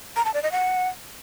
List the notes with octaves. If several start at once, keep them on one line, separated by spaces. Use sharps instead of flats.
A#5
A5
D5
D#5
F#5